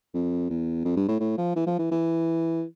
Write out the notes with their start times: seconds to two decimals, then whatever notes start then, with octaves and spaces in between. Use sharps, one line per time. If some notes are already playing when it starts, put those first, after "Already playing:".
0.14 F2
0.50 E2
0.85 F2
0.97 G2
1.08 A2
1.20 A2
1.38 F3
1.56 E3
1.67 F3
1.79 E3
1.91 E3